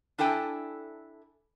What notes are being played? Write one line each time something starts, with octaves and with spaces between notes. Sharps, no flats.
D4 E4 A4 G5 G#5